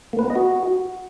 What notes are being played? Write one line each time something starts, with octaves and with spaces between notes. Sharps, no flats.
A#3
B4
B3
D#5
F#4